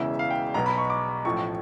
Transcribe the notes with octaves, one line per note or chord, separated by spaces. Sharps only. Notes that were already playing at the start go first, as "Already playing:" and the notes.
Already playing: E1 E2 C#3 E3 E5
F5
G5
B1 B2 A#5
B5
C#6
D6
A1 A2 F3 C#6